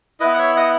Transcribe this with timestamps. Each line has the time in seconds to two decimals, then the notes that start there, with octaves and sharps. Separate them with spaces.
0.20 B3 E4 B4 D#5
0.34 F#5
0.38 C#5 E5
0.56 D#5 F#5